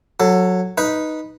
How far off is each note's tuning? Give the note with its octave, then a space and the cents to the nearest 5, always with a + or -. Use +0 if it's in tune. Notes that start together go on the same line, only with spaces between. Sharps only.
F#3 -10 A4 +10
D#4 +0 B4 -10